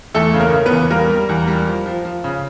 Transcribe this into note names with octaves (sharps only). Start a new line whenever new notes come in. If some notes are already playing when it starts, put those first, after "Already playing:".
E2 A3 A4
C#3
A#3 A#4
C#3
B3 B4
E2
G3 A#3 A#4
G3
E2
G3
F3
F3
F3
C#3